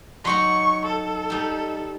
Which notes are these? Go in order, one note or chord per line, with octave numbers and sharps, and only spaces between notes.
F#3 D#4 F#4 C#6
A4
G3 D#4